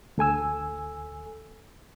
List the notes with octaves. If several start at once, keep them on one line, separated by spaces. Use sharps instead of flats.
D2 A4 G#5 E6